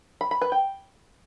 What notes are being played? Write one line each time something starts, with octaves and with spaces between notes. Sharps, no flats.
B5
B5
B4
G5